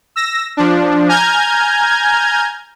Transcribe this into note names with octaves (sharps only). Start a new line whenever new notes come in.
E6 A#6
F3 D4
G#5 A#5 F6 G6 G#6